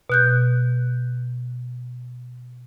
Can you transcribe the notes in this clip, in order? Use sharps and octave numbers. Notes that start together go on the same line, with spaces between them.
B2 F#6 G6